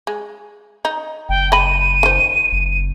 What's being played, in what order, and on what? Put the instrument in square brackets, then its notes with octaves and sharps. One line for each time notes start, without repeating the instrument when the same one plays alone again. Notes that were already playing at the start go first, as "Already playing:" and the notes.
[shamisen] G#3
D#4
[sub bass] F#1 [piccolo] G5
[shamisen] D#5 B5 [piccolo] D#7
[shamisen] D#3 C5
[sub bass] F#1